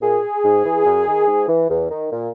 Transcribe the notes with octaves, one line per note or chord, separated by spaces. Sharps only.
A#2 G#4
G#2
E3
F#2
D#3
G#2
E3
E2
D#3
A#2